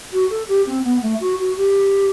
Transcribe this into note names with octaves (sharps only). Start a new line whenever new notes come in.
F#4
A4
G4
C4
B3
A3
F#4
F#4
G4